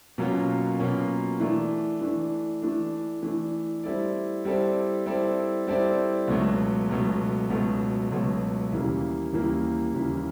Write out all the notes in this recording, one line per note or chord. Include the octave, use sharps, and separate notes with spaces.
B2 F#3 A#3 C#4 F4
B2 F#3 A#3 C#4 F4
E3 A3 D4
E3 A3 D4
E3 A3 D4
E3 A3 D4
G3 C4 E4 A4 D5
G3 C4 E4 A4 D5
G3 C4 E4 A4 D5
G3 C4 E4 A4 D5
C#2 B2 F#3 A3
C#2 B2 F#3 A3
C#2 B2 F#3 A3
C#2 B2 F#3 A3
D#2 C#3 E3 G3 A#3
D#2 C#3 E3 G3 A#3
D#2 C#3 E3 G3 A#3